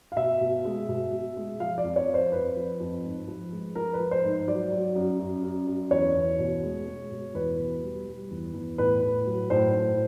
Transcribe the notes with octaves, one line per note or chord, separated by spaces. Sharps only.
F5
B2 E5
B2
G#3
B2
B2
G#3
F3 F5
D5
F2
C#5
F3
C5
F2 B4
F3
F2
G#2
F3
G#3
F3 A#4
B4
F3
C5
G#2
F#3 D5
F#3
F#2
F#2
F#2
F#2
E2 C#5
E2
B2
G#3
G#3
B2
E2 B4
B2
G3
G3
E2
E2
A2 B4
A2
F#3
A2 C5
A2